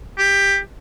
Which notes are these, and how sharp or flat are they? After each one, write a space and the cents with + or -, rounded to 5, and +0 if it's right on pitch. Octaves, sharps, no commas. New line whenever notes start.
G4 +15